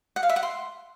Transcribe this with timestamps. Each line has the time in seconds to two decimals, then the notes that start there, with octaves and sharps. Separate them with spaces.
0.16 F#5
0.23 F5
0.29 E5
0.36 F#5
0.43 C6